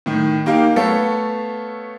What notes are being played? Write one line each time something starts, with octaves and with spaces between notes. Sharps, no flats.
A2 D#3
A#3 D#4 G4 F5
A3 B3 A4 C#5 F5